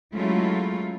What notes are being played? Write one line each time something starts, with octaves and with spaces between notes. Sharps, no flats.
F#3 G#3 A3 C#4 E4 F4